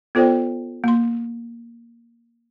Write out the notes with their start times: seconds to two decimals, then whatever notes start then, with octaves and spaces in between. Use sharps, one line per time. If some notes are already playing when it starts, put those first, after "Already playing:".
0.15 B3 F4 A4 C5 D5 G5
0.84 A#3 C6